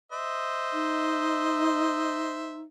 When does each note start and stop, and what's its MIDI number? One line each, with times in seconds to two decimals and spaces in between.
0.12 2.61 72
0.12 2.61 75
0.12 2.61 76
0.73 2.61 63